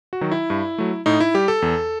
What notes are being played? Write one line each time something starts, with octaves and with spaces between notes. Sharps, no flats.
F#4
D#3 F#3
E4
G2
F#3 A3
A2 D#4
E4
G3 G4
A4
E2